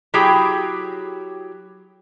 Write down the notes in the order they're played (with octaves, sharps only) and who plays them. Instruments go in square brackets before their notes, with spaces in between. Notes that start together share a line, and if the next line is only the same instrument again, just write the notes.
[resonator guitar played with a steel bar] F#3 E4 G4 G#4 G5